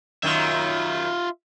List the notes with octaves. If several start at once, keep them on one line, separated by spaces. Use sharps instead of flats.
F#2 D#3 F4 E5